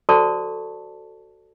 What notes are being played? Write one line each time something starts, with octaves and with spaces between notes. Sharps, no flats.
F#4 A4 C5 D5 A5 C#6